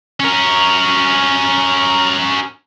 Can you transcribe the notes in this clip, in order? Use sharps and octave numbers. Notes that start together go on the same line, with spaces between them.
C#4 A#4